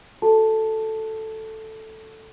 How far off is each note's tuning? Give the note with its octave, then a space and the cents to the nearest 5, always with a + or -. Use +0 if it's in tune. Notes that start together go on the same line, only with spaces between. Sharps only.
F#4 +0 A4 +0 A5 +0